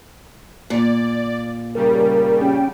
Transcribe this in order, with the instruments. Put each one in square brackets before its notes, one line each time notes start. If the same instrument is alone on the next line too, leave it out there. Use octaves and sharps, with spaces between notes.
[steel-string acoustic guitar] A#2 [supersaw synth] D5
[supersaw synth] C#3 G3 [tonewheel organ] A#4
[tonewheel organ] C#4 G5